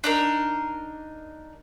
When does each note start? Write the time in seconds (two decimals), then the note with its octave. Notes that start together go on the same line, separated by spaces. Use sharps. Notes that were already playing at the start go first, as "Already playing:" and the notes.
0.04 D4 D#4 A#4